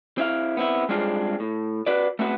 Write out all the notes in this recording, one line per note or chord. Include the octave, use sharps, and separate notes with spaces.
C4 E4 F5
B3 C4 E4
G3 G#3 C4 D4 F4 G#4
A2
F#4 B4 D5
A3 B3 C4 F#4 A#4 B4